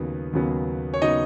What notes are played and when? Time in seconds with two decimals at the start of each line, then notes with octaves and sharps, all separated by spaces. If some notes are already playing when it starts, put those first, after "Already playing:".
Already playing: D#2 C#3 F#3 B3 D#4
0.33 D#2 C#3 F#3 B3
0.94 C#5
1.02 C#3 F#3 B3 D#4 D#5